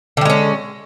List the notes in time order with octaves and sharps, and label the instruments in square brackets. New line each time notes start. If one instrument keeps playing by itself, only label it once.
[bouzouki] D3
G3
G#3
C#4